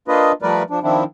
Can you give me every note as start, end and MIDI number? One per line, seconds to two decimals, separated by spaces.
0.08 0.32 58
0.08 0.32 62
0.08 0.32 65
0.08 0.32 71
0.08 0.32 75
0.42 0.63 53
0.42 0.63 55
0.42 0.63 57
0.42 0.63 70
0.42 0.63 71
0.42 0.63 74
0.70 0.79 53
0.70 0.79 62
0.83 1.04 51
0.83 1.04 53
0.83 1.04 60
0.83 1.04 62
0.83 1.04 64